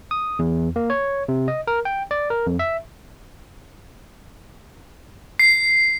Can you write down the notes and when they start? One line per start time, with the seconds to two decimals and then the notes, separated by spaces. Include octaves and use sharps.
0.11 D#6
0.39 E2
0.76 A#3
0.90 C#5
1.28 C3
1.48 D#5
1.67 A#4
1.85 G5
2.11 D5
2.30 A#4
2.47 F2
2.59 E5
5.39 C7